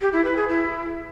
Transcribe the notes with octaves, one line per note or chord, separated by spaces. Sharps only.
G4
E4
B4
G#4
E4